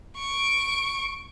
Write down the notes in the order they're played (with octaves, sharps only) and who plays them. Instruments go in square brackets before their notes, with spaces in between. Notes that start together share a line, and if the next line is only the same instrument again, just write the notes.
[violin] C#6 D7